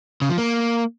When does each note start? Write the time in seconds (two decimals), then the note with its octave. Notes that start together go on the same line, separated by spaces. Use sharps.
0.22 C#3
0.30 F3
0.38 A#3